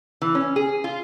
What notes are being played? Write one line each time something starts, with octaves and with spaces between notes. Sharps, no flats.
E3
C#4
G#4
F4